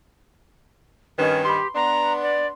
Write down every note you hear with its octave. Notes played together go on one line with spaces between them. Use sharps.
G2 D#3 C#4 B4
G4 B5 C6
B3 D4 A#5 C6
D5